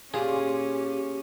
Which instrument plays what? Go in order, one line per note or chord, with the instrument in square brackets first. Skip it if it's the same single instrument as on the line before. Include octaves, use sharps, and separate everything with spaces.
[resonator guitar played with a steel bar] A#2 F4 [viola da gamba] C#4 [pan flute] G4 [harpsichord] G#4